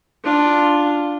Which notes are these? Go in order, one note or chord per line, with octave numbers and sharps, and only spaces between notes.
D4 F4